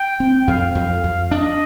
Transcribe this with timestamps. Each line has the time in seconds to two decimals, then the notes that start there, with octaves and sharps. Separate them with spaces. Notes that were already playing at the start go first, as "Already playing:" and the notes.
Already playing: G5
0.20 C4
0.47 F2 F5
0.75 F2
1.04 F2
1.31 D4 D#5